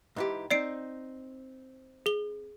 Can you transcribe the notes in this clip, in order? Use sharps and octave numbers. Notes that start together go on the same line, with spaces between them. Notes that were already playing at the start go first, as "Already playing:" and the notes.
G#2 E3 G4
C4 D#4 D5 C7 D7
G#4 G7